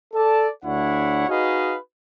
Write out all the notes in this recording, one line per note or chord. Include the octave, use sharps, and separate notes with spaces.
A4 D5 A5
D2 D4 E4 C#5 F#5
D#4 F#4 G#4 B4 D#5 F5